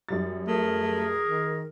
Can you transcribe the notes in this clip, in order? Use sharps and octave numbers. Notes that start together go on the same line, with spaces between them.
F#2 G3 A6
A3 G#4 A#4
D#3